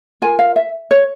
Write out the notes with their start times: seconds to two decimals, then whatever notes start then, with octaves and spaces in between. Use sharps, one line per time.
0.22 F4 A#4 G#5
0.39 F5
0.56 E5
0.91 C#5